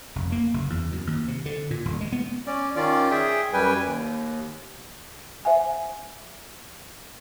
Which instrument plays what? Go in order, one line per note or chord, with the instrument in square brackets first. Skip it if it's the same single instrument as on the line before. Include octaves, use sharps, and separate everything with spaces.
[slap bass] F1
A#3
F#1
E2
F#2
D#2
C3
D3
A#2
D#1
G#3
B3
[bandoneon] C#4 D5
D#3 C#4 F4 D5
G#4 E5 G5
F#2 G3 B4 G5 G#5
D#2
[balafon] C5 E5 F#5 G#5